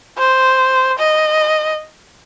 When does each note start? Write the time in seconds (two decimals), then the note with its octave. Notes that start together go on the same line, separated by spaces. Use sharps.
0.18 C5
0.98 D#5